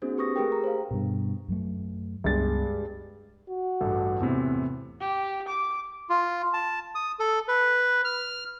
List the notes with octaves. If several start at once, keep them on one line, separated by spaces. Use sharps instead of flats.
A#3 C4 D4 F#4 G#4 C5
G4 B4 C#6 D#6 A#6
A3 G4 G#4 A#4 B4 G5
A#5
C5 F5
G2 B2
F#2 F#3 A3
C#2 G2 F3 G#3 B3 A6
F#4
A1 G2 A4
E2 A2 C3
G4
D6
F4
A5
D#6
A4
B4
F6